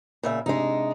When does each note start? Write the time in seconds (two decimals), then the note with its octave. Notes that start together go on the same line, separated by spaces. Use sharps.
0.23 A#2 C#3 E5
0.46 C3 G#3 D4 D#4